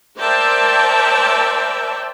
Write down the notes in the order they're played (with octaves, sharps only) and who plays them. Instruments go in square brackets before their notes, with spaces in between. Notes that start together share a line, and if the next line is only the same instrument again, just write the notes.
[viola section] A#4 C5 D5 E5 G5 A5